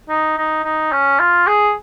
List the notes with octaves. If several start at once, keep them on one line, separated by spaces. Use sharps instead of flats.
D#4
D#4
D#4
C#4
F4
G#4